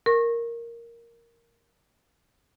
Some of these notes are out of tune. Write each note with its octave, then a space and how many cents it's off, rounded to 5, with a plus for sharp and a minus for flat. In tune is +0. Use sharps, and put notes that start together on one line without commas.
A#4 +0 C#6 -30